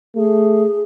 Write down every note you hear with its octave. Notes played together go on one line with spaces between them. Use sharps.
A3 G#4